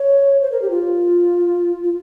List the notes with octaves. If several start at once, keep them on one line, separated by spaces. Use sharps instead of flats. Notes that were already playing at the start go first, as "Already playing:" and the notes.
Already playing: C#5
C5
A#4
G4
F4
F4